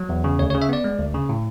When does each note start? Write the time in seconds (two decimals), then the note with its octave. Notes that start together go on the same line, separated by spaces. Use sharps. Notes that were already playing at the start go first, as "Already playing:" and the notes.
Already playing: F#3
0.09 E2
0.24 C#3
0.39 D2 C#5
0.50 C#5
0.54 C#3
0.62 E5
0.69 B3 D5
0.84 G#3
0.99 D2
1.14 C#3
1.29 A2